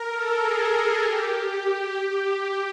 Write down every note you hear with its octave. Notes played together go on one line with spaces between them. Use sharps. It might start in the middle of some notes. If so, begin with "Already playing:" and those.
Already playing: A#4
A4
G#4
G4